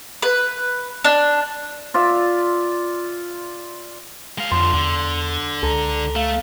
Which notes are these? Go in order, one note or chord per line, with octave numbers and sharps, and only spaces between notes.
B4
D4
F4 D5 E5
G#3 F5
F2 D3 F3 C6
E2 D3
C#2 A4 A#5
A3 F5